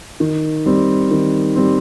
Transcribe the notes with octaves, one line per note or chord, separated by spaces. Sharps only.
D#3
G3 C4
D#3
G3 C4